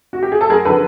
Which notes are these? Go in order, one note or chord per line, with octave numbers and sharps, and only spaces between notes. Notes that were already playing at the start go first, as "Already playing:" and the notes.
F#4
G4
G#4
A4
F#2 G#4 A#4
D3 F3 A4 B4